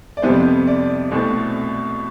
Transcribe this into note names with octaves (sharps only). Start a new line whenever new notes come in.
D5
F2 C3 G3 B3 C5
D5
C2 B2 A3 C4